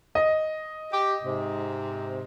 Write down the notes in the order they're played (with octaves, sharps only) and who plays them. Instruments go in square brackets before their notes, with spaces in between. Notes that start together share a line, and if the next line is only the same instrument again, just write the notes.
[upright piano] D#5
[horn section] G4
G#2 C3